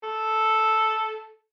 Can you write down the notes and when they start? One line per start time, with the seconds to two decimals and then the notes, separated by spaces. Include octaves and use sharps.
0.03 A4